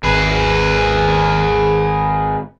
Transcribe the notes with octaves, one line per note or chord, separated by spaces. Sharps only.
G#1 G#4 B4